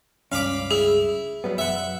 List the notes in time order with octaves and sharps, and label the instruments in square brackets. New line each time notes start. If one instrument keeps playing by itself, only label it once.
[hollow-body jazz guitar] C#2 G2 C#4 [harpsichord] F5 B5 D6
[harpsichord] E4 [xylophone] G#4
[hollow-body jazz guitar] F#3 G3 B3
[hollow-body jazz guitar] F#2 [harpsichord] E5 F#5